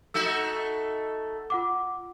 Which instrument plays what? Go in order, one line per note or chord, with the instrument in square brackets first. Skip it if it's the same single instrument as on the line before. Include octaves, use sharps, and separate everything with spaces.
[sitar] A3 D#4 F#4 [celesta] E6
[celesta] F4 F#5 D6